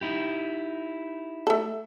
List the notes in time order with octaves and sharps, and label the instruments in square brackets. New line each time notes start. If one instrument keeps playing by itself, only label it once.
[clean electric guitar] D#4 E4 G4
[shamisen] A3 A4